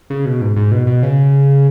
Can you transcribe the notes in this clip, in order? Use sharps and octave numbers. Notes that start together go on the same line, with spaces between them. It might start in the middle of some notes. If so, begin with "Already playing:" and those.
C#3
B2
G#2
G#2
B2
B2
C#3